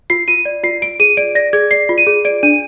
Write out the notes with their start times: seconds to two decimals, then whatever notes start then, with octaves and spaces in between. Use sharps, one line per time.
0.10 F4 C7
0.28 F4 D#7
0.45 D5
0.63 F4 C7
0.82 F4 D7
1.00 G#4 D#7
1.17 D5 D7
1.35 D5 A#6
1.53 G#4 G#6
1.71 D5 C7
1.89 F4
1.98 D#7
2.07 G#4
2.25 D5 D7
2.43 D4 D#7